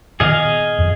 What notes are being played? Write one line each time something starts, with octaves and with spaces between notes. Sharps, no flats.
A#2 D#3 B3 G#4 D#5 F5
F2